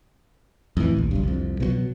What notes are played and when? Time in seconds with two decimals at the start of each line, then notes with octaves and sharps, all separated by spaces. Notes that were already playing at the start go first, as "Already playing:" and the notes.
0.77 F2 A2 E3
0.97 A#1 D#2
1.11 F#1 B1 G2
1.23 C2 F2
1.60 B2 E3 F#3